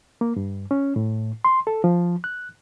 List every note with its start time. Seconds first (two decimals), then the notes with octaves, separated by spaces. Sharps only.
0.21 A#3
0.36 G2
0.71 C#4
0.96 A2
1.44 C6
1.67 A4
1.84 F3
2.24 F#6